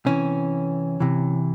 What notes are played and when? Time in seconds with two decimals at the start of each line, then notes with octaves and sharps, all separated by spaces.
0.06 C3 E3 C#4
1.00 C3 E3